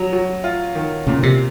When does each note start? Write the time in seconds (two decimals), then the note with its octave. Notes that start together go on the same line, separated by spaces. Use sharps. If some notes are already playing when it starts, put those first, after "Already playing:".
Already playing: F#3
0.13 F#3
0.44 F4
0.75 D#3
1.07 A#2 C#3
1.23 C3